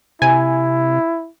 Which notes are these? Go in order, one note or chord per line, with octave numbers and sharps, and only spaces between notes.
C3 E4 G#5